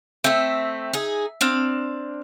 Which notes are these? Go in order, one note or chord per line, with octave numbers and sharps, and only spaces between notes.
A3 C4 E5
D#4 G#4
C4 D4 F5